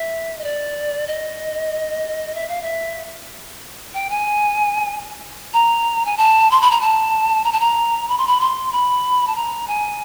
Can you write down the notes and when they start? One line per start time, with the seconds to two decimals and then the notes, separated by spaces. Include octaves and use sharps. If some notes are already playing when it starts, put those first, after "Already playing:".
Already playing: E5
0.39 D#5
0.44 D5
1.07 D#5
2.35 E5
2.48 F5
2.62 E5
3.94 G5
4.10 G#5
5.53 A#5
6.05 G#5
6.17 A5
6.51 C6
6.61 B5
6.71 A#5
6.81 A5
7.44 A#5
7.52 A5
7.60 A#5
8.08 B5
8.18 C6
8.27 B5
8.40 C6
8.72 B5
9.27 A5
9.36 A#5
9.67 G#5